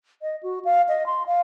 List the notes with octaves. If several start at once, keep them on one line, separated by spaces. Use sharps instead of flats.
D#5
F#4
F5
D#5
C6
F5